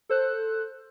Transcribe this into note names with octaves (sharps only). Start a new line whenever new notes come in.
A4 C5 F#6